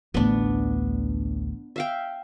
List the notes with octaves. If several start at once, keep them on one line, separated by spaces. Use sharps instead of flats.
A1 D2 B3 D4
E5 F5 G5